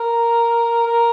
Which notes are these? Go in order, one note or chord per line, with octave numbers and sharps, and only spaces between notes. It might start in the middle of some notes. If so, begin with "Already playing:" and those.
Already playing: A#4
A#4